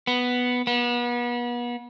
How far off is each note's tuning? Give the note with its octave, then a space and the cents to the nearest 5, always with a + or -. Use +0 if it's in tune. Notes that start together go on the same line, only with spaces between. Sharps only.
B3 +0
B3 -35